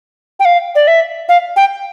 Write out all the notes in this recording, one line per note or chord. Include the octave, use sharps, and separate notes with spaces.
G5
F5
D5
E5
F5
G5